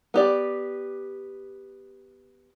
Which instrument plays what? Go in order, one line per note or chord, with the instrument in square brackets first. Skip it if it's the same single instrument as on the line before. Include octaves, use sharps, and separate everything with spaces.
[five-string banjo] B3 G4 D5